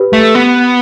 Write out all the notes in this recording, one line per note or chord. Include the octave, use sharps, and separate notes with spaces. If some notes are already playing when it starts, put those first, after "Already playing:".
Already playing: G4 B4
A3
B3